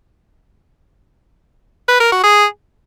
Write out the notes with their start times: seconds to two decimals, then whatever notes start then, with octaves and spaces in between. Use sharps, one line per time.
1.88 B4
2.00 A#4
2.12 F#4
2.24 G#4